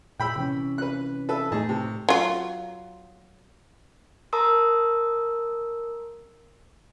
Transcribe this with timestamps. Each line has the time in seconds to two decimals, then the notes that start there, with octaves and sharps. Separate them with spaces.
0.20 A#2 G5 B5 E6
0.35 C3 E3 C#4
0.78 B4 F#6
1.29 A4 B4 E5
1.52 A2 A3 D#4 G#4 A5
1.69 C3
2.09 F#3 F4
4.33 A#4 A5 A#5 C6 D#6 E6